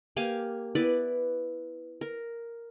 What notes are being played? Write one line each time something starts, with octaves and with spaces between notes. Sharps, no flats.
A#3 G4 F5 G#5
B3 E4 B4 D5
A#4